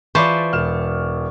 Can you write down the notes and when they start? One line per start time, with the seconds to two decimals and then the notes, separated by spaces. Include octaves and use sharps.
0.15 E3 F4 C5 D5 A5 B5 C#6
0.53 E1 F6 E7